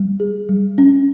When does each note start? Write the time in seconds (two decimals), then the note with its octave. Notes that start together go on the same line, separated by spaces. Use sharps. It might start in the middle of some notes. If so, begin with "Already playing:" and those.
Already playing: G3
0.20 G#4
0.49 G3
0.78 C#4